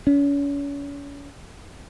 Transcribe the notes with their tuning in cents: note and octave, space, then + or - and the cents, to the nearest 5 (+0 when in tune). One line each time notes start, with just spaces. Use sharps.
C#4 +35